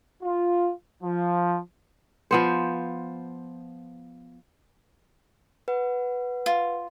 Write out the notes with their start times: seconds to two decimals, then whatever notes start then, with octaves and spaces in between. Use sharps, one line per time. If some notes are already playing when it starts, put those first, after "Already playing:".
0.22 F4
1.02 F3
2.31 F3 B3 C5
5.68 B4 F#5
6.46 F4